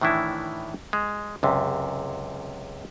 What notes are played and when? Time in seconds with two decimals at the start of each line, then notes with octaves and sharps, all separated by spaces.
0.01 A2 D#3 E3 D4 E4
0.93 G#3
1.43 C#2 F#2 C3